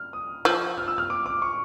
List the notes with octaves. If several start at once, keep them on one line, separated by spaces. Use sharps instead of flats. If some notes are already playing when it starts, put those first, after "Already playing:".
Already playing: F6
D#6
F3 E6
F6
E6
F6
D6
D6
C#6